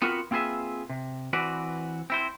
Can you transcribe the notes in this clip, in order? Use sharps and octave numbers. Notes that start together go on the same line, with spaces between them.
B3 C4 F4 F#4 A#4 B4
A#3 C4 F4 G#4 B4 E5
C3
E3 C4 F#4 B4 D5
C4 E4 C5